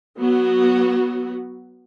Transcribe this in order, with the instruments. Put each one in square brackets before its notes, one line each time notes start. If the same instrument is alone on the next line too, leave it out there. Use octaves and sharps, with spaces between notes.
[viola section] F#3 B3 F#4